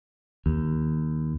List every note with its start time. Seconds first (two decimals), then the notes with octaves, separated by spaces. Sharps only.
0.46 D#2